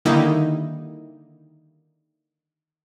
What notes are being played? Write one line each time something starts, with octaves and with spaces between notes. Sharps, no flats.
D3 D#3 G3 A#3 D#4 E4